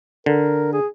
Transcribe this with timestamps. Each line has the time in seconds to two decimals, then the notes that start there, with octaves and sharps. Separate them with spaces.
0.26 D3 A#4
0.73 G#4